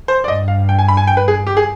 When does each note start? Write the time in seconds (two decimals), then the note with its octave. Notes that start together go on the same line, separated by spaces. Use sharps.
0.08 C5
0.24 D5
0.28 G2 D#5
0.48 F5
0.69 G5
0.79 G#5
0.88 B5
0.97 G#5
1.07 G5
1.17 B4
1.28 G#4
1.47 G4
1.57 G#4